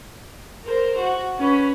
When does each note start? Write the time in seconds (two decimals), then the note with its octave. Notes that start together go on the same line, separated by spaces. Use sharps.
0.65 A#4 C5
0.98 F#4
1.39 C#4 B4